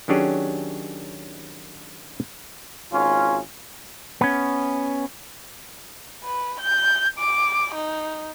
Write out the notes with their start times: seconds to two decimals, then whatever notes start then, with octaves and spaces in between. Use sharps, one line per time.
0.08 D#3 F#3 C#4 D4 G4 G#4
2.92 G#1 C#4 F4
4.21 B3 C#4
6.24 B4
6.61 G6
7.19 D6
7.75 D#4